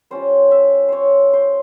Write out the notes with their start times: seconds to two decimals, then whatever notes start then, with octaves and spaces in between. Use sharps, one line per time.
0.10 G3 C#4 F4 C5
0.51 E5
0.89 C5 C#5
1.33 C5